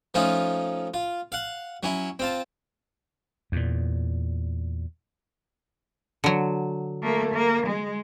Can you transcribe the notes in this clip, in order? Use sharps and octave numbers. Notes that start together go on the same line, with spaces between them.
F3 A3 C#4 D#4 F4
F4
F5 F#5
F#3 C#4 E4
C4 F4 A5
E2 A#2
D3 F#3
A3 A#3
A#3
G#3